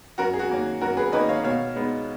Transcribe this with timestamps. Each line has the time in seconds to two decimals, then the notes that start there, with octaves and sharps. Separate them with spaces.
0.18 F#2 F#4 A#4
0.33 G#4
0.39 F#4
0.50 D#3 A#3 C#4
0.81 F#2 F#4 A#4
0.97 G#4 B4
1.12 D#3 A#3 C#4 B4 D#5
1.29 C#5 F5
1.44 B2 C#5 F5
1.76 G#3 B3 D#4